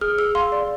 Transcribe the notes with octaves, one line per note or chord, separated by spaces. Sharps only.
G#4 F6
G#4 E6
F5 C6
D5